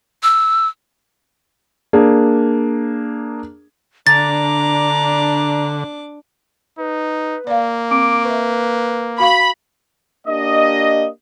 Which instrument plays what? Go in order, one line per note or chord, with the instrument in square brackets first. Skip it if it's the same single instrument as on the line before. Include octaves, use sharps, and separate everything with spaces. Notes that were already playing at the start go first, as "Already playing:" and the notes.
[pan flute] E6
[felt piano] A#3 D4 G#4
[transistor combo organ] D3 [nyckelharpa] D4 D6 [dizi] A#5 [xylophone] A6
[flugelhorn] D#4 [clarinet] B4
[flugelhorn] A#3 [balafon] D5 F5
[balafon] C4 [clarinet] D6
[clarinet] B4 [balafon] E5 C#6
[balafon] F#4 F5 C#6 [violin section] B5
[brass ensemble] A#3 D4 G4 D#5